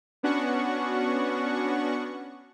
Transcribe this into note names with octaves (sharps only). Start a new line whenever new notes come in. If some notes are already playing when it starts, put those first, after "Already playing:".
B3 C#4 D4 F#4 F#5 C#6